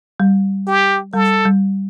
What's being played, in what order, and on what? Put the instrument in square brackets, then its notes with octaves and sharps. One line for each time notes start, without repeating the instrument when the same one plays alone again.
[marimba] G3
[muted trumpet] G4
[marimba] G3 [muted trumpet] A4
[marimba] G3